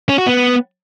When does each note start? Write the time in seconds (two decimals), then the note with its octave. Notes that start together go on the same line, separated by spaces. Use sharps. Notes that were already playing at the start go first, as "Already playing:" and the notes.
0.09 C#4
0.18 F#4
0.27 B3